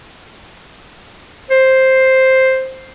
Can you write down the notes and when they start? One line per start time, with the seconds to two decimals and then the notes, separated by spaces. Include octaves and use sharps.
1.51 C5